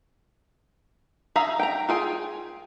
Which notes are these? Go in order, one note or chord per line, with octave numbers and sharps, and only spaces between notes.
G#4 E5 F5 A#5
G5 A#5
F4 G#4 G5